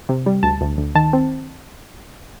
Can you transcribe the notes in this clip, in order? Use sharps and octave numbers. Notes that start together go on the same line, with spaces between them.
C3
G3
D2 A5
D2
D2
D#3 A5
C4